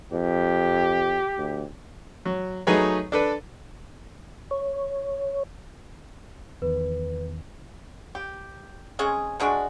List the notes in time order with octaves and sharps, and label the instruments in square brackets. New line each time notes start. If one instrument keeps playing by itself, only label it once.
[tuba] F2 [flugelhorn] G4
[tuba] D2
[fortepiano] F#3
F#3 A3 D#4 G#4 B4 C#5
D4 A4 B4
[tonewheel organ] C#5
[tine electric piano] E2 D#3 [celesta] B4
[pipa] G4
G#3 C4 C#4 G#4
F3 G#3 D4 F#4